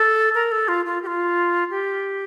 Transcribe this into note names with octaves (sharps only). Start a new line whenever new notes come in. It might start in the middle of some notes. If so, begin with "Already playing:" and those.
Already playing: A4
A#4
A4
F4
F4
G4
F4
G4